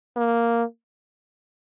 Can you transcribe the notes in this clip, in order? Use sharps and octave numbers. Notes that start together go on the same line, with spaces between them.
A#3